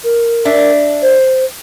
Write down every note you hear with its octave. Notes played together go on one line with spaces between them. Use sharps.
A#4
D4 E5
C5